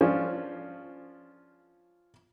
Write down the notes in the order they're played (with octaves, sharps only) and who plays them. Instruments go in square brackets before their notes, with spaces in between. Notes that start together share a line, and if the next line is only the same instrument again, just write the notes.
[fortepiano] F3 C#4 D4 F4